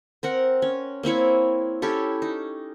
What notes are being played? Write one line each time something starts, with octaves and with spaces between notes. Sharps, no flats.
C4 A#4 F#5
C#4
A#3 C4 E4 C#5
C#4 E4 G4 A4
D#4